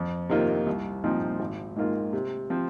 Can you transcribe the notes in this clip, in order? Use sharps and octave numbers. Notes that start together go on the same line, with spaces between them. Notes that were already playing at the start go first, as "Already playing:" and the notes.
Already playing: F2
C3 D#3 A#3 F4
C2
A#2 F3 C4 D#4
G#1
G#2 D#3 A#3 F4
C3
F3 C4